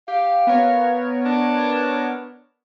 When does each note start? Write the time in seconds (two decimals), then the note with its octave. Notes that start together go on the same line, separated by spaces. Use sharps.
0.08 G4 F5
0.47 B3 A#4 C#5
1.25 D4